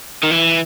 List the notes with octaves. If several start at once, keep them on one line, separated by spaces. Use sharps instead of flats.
D#3
E3